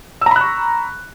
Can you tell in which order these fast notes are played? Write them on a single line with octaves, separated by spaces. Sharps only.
E6 A#5 B5 F#6 C#6